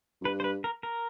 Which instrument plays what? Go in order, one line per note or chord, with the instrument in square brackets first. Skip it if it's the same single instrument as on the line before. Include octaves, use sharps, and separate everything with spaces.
[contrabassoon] F#2
[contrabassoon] G2 [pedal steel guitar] B4
[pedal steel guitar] C5
B4
A#4
A#4